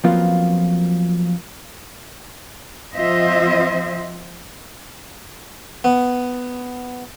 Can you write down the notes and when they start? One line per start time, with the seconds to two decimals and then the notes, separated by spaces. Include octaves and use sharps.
0.04 F2 F3 F#3 A#3 B3 F4
2.95 F3 C4 F4 C5 D#5 E5
5.84 B3